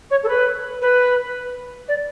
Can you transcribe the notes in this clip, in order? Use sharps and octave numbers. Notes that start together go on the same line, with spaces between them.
C#5
A4
B4
B4
D5